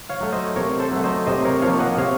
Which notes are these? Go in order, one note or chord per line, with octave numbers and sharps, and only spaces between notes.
C#5 F5
F#3 A3
C5 D#5
C3 A#4 C#5
A4 C5
F#3 A3
C5 D#5
C3 C5 D#5
A#4 C#5
F3 A#3 C#5 F5
D#5 F#5
C3 C#5 F5